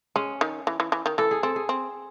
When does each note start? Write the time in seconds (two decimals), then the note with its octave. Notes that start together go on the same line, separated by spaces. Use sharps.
0.16 G#3 C#4
0.41 D#3
0.67 E3
0.80 E3
0.92 E3
1.06 D#3
1.18 E3 A4
1.31 G#4
1.43 C4 A4
1.56 G#4
1.69 C4